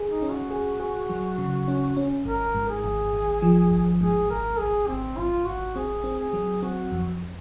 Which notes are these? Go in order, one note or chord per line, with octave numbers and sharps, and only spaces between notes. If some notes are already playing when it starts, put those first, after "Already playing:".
Already playing: G#4
D#4
C#4
F#4
G#4
G#4
F#3
C#3
C#4
C#4
G#1 A#4
G#2
G#4
G#1
G#1
F3
G#1
G#2 G#4
G#1 A#4
G#1 G#4
G#1 C4
G#1 F4
G#1 F#4
C4 G#4
C4
G#4
F#3
C4 F#4
F2